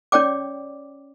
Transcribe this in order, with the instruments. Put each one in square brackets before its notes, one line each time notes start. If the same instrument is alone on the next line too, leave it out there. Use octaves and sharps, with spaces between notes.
[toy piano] C#4 C#5 D5 G5 D6